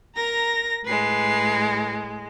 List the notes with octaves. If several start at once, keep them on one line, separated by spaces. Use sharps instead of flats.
A#4 A#5 A#6
A2 G#3 B4 C7